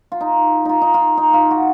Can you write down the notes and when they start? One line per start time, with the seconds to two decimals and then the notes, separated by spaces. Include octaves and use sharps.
0.12 F4
0.21 D#4
0.65 D#4 F4
0.81 D#4
0.94 F4
1.17 D#4
1.34 F4
1.51 F#4